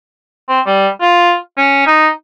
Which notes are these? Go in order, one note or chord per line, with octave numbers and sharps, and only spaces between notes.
C4
G3
F4
C#4
D#4